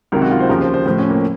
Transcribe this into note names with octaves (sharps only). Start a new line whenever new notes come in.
C#2 C3 D#3 F#3 A#4
F#4
F4
C5
D#2 C#3 F3 A#4
C5
C5
A2 F3 C5
C#4
A#3